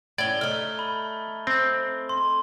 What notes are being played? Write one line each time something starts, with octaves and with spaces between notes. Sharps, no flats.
A2 C#4 D5 G#6 A6 G7
A3 D#4 F6
B5
C4
C6